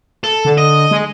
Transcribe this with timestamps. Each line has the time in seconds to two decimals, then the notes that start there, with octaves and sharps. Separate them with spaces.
0.24 A4
0.45 D3
0.58 D#5
0.91 G#3